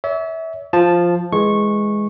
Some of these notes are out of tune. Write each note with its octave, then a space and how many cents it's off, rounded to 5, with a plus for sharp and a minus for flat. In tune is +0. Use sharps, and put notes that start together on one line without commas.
C#5 +40 E5 -20
F3 +0 A5 -5
E3 +0 G#3 +0 C#6 -15